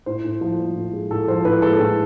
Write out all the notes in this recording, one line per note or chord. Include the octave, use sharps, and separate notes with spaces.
A2 C5
A2
F3
F3
A2
G#3
A2 A4
F3 C5
A2 B4
G#3 A4
A2